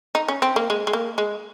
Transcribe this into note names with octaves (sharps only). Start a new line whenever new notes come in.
D#4
C#4
C4
A#3
G#3
G#3
A#3
G#3